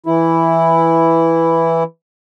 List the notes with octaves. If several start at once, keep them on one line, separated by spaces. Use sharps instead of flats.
E3 E4